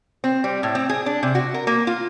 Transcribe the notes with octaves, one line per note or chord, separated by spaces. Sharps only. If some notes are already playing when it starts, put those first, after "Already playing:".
C4
G3
A2
C4
G#4
D4
C3
F#4
A#4
A#3
F4